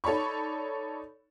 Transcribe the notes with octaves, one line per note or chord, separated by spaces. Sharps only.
D#4 A4 C#5 D5 B5 C#6